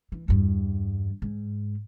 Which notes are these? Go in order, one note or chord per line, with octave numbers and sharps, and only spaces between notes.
E3
E2 G2
G#2